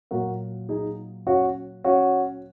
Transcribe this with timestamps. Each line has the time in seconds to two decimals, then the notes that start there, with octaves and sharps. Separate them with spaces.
0.11 A#2 F#3 F#4 A#4
0.69 D#4 G#4
1.27 C#4 F#4
1.84 C#4 F#4